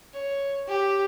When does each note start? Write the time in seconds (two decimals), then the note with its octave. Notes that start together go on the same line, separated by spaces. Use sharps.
0.13 C#5
0.68 G4